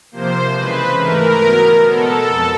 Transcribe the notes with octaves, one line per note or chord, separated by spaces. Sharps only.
C3 F3 A#3 C5
C#3 E3 G#3 B4
G#2 E3 A3 A#4
B2 F#3 B3
B2 G#3 B3 A4
F2